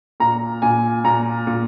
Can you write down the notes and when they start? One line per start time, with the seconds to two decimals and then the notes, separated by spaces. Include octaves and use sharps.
0.20 A#2 A#5
0.62 A#2 G#5
1.04 A#2 A#5
1.47 A#2